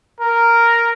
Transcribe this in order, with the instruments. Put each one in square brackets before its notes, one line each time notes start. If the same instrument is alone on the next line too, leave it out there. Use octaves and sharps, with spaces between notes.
[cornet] A#4